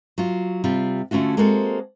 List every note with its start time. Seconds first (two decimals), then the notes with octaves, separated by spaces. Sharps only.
0.18 F#3 F4
0.64 C3 G3 F4
1.11 D3 A3 C#4 F4 F#4
1.37 G#3 A#3 C4 F#4 A4